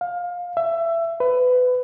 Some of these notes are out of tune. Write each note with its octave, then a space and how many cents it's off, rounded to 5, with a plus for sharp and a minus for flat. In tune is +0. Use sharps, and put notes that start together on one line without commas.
F5 +20
E5 +20
B4 +25